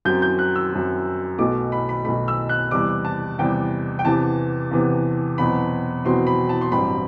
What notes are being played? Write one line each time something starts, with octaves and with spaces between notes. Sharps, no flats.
F#2 F#3 C4 G6
G6
F#6
E6
F#2 F#3 C4
B1 B2 A3 D6
B5
B5
B1 B2 A3 B5
E6
F#6
E2 C3 G3 D6
A5
E2 C3 G3 G5
G5
E2 C3 E3 B3 A5
E2 C3 E3 B3
E2 B2 F#3 C4 B5
E2 B2 F#3 C4 C6
B5
A5
C6
A1 G2 F#3 C4 B5